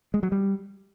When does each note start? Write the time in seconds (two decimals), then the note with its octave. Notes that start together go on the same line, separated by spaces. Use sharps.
0.14 G#3
0.23 F#3
0.32 G3